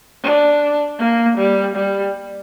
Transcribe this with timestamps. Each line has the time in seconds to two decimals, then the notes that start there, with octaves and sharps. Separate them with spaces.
0.23 D4
1.00 A#3
1.37 G3
1.75 G3